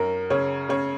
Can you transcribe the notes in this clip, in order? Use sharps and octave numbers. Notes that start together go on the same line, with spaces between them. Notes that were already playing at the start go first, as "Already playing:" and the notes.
Already playing: F#2 A#4
C#3 C#5
C#3 C#5